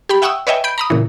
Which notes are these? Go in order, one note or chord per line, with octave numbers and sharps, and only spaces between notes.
G4 G5 B5
E5 F#5 G5 C#6 D#6 E6
B4 C#5 D#5 E5 G5 G#5
B5 G6 D7
A#5 B5 D#6
A#2 C#3 E3